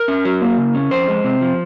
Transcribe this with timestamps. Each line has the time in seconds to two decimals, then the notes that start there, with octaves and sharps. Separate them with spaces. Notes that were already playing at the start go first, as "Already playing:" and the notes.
Already playing: A#4
0.08 C#4
0.25 F#3
0.42 A#3
0.58 C#3
0.75 C#4
0.91 F2 C5
1.08 G#3
1.24 C3
1.41 F3